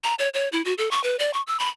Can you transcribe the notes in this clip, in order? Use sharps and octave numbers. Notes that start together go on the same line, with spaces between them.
A#5
C#5
C#5
E4
F#4
A4
C#6
B4
D5
C#6
E6
B5